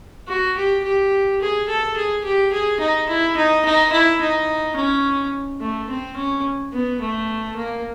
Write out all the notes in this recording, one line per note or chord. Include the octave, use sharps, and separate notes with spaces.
F#4
G4
G4
G#4
A4
G#4
G4
G#4
D#4
E4
D#4
D#4
E4
D#4
C#4
A3
C4
C#4
B3
A3
A#3